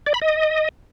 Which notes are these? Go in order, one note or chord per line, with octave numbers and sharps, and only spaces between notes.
D5
B5
D#5